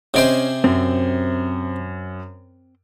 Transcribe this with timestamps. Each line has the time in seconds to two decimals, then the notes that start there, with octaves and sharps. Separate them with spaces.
0.14 C3 C#4 G#4 C5 D#5 D7
0.64 F#2 C4